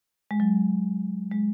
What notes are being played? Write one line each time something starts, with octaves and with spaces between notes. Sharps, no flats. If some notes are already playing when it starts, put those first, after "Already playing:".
G#3
F#3
G#3